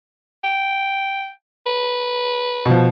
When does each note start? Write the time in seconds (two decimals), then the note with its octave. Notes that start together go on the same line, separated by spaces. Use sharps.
0.44 G5
1.66 B4
2.65 B2 F3